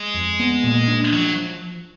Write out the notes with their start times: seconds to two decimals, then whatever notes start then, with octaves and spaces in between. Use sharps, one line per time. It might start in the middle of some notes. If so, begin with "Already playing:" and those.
Already playing: G#3
0.14 F2
0.39 B3
0.64 A#2
0.88 D4
1.13 F3 F#3